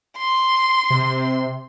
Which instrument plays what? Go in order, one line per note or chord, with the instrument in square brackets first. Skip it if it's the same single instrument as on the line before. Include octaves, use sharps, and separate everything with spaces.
[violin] C6
[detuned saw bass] C3